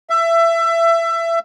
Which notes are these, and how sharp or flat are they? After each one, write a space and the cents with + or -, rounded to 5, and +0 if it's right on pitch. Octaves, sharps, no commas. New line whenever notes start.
E5 +20